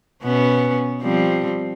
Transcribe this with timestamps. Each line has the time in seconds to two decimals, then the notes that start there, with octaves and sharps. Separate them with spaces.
0.24 B2 B3 C#4
1.02 F3 G3 C4